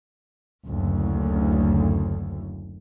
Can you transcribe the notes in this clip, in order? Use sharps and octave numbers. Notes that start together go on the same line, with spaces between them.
F#1 D2